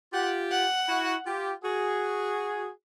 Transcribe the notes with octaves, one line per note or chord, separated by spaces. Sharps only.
F4 G4 F#5
F#5
E4 F#4
F4 G4
F#4 G#4